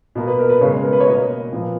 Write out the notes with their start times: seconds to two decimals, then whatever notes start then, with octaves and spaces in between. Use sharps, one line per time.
0.15 B2 A#3
0.28 B4
0.39 A#4
0.49 B4
0.61 C#3 G#3 B3 C#5
0.71 B4
0.82 A#4
0.93 B4
1.00 C#5
1.07 B2 A#3 D#5
1.53 A#2 F3 B3